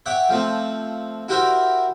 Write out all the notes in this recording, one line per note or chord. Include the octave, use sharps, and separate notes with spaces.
C#5 E5 F#5 G5 D6
F3 A3 C4
E4 F#4 G4 A#4 C5 E5